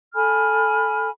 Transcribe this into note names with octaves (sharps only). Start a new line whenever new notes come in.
A4 G#5 B5 F6